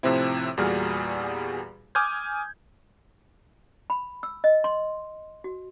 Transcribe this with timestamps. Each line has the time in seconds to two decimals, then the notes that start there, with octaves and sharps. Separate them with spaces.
0.03 A2 C3 F3 C4 E4
0.57 E2 A#2 G3 F#4 G#4 F6
1.95 G#5 D6 D#6 F6 G6 G#6
3.90 B5
4.23 E6
4.44 D#5
4.64 C6
5.44 F#4